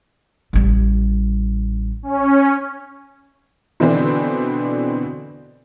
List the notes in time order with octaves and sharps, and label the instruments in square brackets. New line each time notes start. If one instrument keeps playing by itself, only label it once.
[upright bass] A1 G3
[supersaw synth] C#4
[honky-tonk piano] B2 D3 E3 C4 D4